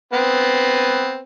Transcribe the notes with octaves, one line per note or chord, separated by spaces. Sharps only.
B3 C4 B4